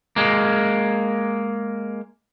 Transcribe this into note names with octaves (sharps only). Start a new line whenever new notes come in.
G#3 A#3